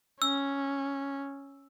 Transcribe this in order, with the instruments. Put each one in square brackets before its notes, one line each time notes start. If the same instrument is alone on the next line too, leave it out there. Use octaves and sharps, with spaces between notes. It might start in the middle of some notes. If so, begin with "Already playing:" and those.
[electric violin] C#4 [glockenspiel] E6